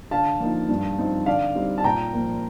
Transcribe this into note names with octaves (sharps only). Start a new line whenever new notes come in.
D3 F5 A5
F3 A#3 D#4
G2
F3 C4 D#4
D3 D5 F5
G3 C4 D#4
A5
A#2 G5 A#5
F3 A#3